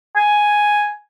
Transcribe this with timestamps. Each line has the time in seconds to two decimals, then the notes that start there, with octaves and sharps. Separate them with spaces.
0.17 G#5